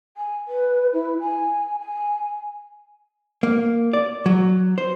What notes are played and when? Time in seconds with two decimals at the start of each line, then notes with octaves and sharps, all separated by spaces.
0.17 G#5
0.48 B4
0.93 E4
1.20 G#5
1.80 G#5
3.43 A#3
3.93 D5
4.26 F#3
4.78 C5